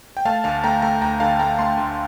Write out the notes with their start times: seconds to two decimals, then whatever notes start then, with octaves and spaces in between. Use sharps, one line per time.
0.17 G5
0.25 A3 F5 A5
0.44 D2 F5 A5
0.64 A3 G5 A#5
0.82 A3 G5 A#5
1.01 D2 G5 A#5
1.20 D3 F5 A5
1.39 A3 G5 A#5
1.59 A3 A5 C6
1.77 D2